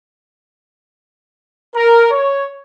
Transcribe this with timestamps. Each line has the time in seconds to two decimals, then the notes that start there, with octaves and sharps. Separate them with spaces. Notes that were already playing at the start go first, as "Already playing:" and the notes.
1.75 A#4
2.11 C#5